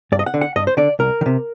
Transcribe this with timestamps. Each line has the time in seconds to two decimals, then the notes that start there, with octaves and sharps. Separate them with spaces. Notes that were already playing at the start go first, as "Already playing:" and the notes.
0.12 G2 D5
0.19 D#5
0.26 F#5
0.34 D3
0.41 F#5
0.56 G2 D#5
0.67 C5
0.77 D3 D5
0.99 C2 A#4
1.21 D#3
1.26 C3